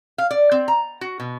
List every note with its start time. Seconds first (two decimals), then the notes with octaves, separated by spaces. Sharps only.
0.18 F5
0.31 D5
0.52 C4
0.68 A#5
1.01 F#4
1.20 B2